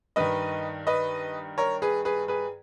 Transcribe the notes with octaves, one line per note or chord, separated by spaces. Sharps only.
G2 D#3 B4 D#5
B4 D#5
A#4 C#5
G#4 B4
G#4 B4
G#4 B4